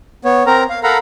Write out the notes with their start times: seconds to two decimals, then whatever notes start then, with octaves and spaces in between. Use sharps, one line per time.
0.25 B3 C#5
0.47 C4 A#4 A#5
0.70 F5
0.84 A4 A#4 F5 F#5 A#5 B5